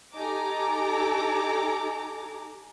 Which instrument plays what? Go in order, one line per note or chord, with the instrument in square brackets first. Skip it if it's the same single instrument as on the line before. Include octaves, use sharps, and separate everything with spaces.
[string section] D#4 G4 A4 G#5 A#5 D6